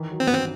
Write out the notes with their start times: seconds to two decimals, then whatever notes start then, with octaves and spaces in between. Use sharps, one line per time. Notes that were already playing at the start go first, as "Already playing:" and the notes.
Already playing: D#3 E3
0.11 F#3
0.20 C4
0.27 G2 B3
0.34 C4